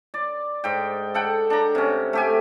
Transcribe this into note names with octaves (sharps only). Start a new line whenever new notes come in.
D5
G#2 G5
A4 F#5 G5
D4 A#5
C3 C#4
A3 G4 G#5